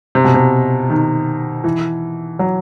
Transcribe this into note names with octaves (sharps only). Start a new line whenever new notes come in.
C3
B2
C3
D#3
E3
F#3